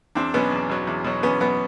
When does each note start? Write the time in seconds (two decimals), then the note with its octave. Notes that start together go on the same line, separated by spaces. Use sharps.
0.15 E2 C4 D4
0.34 B2 F#3 B3 C#4
0.51 E2
0.69 B2 F#3
0.87 E2
1.04 B2 F#3
1.23 E2 B3 C#4
1.40 B2 F#3 B3